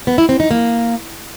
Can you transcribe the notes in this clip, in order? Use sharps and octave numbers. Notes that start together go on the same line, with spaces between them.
B3
E4
C4
D#4
A#3